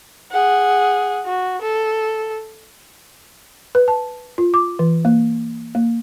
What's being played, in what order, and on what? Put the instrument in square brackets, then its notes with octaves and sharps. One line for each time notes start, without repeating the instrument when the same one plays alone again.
[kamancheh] G#4 F#5
F#4
A4
[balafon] B4
A5
F4
D6
E3
A#3
A#3